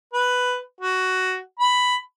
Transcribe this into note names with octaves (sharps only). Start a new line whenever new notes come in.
B4
F#4
B5